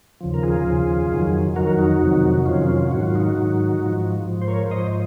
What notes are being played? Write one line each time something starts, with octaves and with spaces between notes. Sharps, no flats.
D#2 C#3 F3
A#4
F4 G#4
D#2 C#3 F3
F2 D#3 F#3
F2 D#3 F#3 F#4 A#4
D#4 F#4
F2 C3 D#3 F#3
F2 C3 D#3 F#3 C#4 F4
C#4 F4
G#2 D#3 F#3 F#4
F4
D#4 F#4
G#2 D#3 F#3
G#2 F3
G#2 F3
C5
A#4 C#5
G#2 F3 C5 D#5